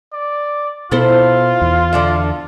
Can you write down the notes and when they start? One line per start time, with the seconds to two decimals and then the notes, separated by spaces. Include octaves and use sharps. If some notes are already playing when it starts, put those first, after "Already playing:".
0.13 D5
0.92 B2 B3 E4 F4 A4 C5
1.62 E2
1.93 D3 D4 E5